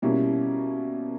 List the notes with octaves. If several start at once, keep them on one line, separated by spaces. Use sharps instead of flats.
B2 G3 A#3 C#4 E4